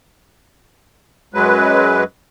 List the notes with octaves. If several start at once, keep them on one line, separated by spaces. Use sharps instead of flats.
F#2 F#3 G#3 B4